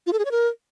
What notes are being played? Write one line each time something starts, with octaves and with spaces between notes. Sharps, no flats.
F4
A4
G#4
C#5
A#4